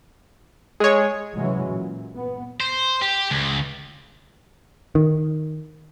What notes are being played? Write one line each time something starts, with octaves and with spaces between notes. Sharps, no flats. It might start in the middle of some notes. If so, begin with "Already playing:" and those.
G#3 G#4 C#5
C3 E3 F#3 G#3 C#4
A#2
B3
C5
G4
C#2
D#3